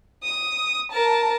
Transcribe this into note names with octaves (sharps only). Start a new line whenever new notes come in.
D#6
A#4 A5